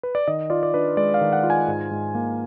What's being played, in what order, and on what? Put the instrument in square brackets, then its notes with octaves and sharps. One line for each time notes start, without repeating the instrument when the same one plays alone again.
[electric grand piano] B4
D5
D#3 D#5
F4 D5
D5
D4 B4
G#3 D5
F5
D#3
F#5
F4
G#5
G#2
G#2
A#3